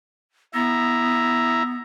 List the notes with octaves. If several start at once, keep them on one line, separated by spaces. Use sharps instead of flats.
B3 E4 E5 A#5